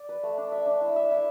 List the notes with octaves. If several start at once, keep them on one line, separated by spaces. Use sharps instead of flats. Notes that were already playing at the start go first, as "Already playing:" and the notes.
Already playing: D5
B4
A3
D4
E5
D4
E4
E5
E4